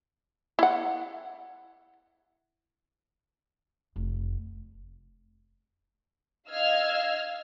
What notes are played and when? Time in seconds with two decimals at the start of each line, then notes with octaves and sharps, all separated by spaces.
0.59 E4 F#5
3.96 F1
6.50 D#5 F5 E6 F6 G#6